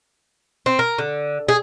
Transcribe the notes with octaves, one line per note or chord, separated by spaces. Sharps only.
C4
A#4
D3
G#4